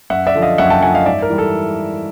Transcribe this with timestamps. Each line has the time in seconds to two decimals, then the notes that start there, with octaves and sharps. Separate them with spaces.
0.10 F#2 E5 F#5
0.27 D5 E5
0.35 D3 F3
0.42 D#5 F5
0.58 F#2 E5 F#5
0.70 G5 A5
0.82 D3 F3 F#5 G#5
0.94 D#5 F5
1.06 G#2 D5 E5
1.22 A#4
1.30 E3 G3
1.38 A4